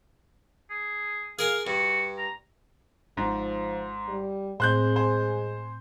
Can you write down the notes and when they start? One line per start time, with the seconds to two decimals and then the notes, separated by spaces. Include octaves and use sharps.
0.70 G#4
1.39 G#4 A#4 F5 G#5
1.67 G2 F#4
2.18 A#5
3.17 G#1 G#2 F3
4.08 G3
4.60 A2 G#3 C4 C5 F#6 G6
4.96 C5 G#5